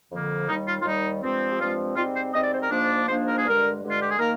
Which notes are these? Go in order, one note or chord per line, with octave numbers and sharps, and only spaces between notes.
F2 D3 F3 A#3
D#2 D#3 G3 D#4
F4
F4
D#2 D#3 G3 D#4
G2 F3 G#3 C4
G4
G2 F3 G#3 C4 F4
G#2 G3 C4 F4
C5
G#2 G3 C4 D#5
D5
C5
A#4
G#2 F3 A#3 D4
G#2 F3 A#3 D4 C5
A#4
G#4
G2 D3 G#3 A#4
G2 D3 G#3
F4
G4
G#4
D#3 A#3 A#4